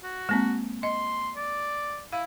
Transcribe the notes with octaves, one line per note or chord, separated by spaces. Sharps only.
F#4
G#3 A#3 C4
D#5 C6
D5
E4 F5